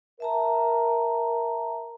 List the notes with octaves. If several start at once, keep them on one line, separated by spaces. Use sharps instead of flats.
A#4 E5 A5 A#5